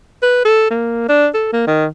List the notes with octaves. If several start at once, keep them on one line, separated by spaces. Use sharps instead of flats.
B4
A4
A#3
D4
A4
A#3
D#3